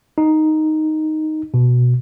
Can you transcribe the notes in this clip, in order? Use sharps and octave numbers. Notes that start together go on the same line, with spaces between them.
D#4
B2